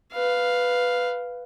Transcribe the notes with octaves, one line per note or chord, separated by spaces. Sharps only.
B4 F5